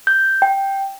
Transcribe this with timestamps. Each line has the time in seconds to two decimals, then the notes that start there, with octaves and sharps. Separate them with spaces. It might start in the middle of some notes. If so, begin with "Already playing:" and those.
0.07 G6
0.42 G5